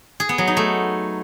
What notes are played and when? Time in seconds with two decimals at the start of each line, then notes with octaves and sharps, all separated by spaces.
0.20 G#4
0.29 B3
0.38 F#3
0.47 D#4
0.57 A3